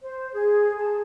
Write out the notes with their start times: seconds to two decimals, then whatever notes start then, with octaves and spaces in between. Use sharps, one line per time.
0.03 C5
0.34 G#4
0.79 A5